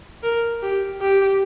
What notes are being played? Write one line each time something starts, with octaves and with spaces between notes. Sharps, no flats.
A#4
G4
G4